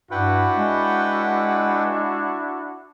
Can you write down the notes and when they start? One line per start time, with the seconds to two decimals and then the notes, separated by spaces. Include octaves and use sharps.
0.11 G2 D4 E4 F#4 B4 F#5 G5
0.57 G#3